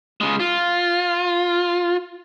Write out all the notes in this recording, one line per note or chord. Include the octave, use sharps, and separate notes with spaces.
C#3 G#3
F4